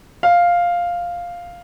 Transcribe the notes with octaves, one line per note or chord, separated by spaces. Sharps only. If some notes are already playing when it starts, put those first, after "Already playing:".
F5